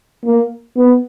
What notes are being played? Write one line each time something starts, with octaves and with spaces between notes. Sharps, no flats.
A#3
B3